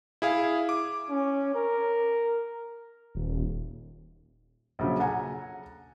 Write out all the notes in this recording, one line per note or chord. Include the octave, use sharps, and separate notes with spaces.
E4 G#4 F5
D6
C#4
A#4
D#1
A#1 C#3 F#3
A4 F#5 G#5 A#5